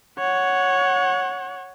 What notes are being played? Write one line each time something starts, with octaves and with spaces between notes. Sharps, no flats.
C#5 F#5